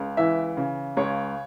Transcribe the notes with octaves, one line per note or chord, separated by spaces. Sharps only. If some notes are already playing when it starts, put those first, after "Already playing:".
Already playing: C#2
E3 E5
C#3
C#2 C#5